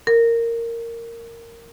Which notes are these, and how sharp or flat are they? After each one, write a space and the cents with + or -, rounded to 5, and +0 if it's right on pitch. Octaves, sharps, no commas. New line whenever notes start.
A#4 -10